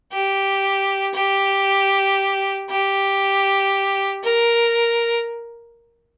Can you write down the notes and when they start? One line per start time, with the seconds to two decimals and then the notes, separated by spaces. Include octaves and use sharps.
0.12 G4
1.15 G4
2.70 G4
4.24 A#4